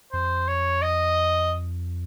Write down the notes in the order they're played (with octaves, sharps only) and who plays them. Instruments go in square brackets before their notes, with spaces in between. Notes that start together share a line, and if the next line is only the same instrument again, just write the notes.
[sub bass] F2 [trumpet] C5
[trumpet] C#5
D#5